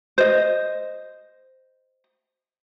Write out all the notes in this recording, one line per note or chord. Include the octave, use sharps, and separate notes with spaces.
C5 D#5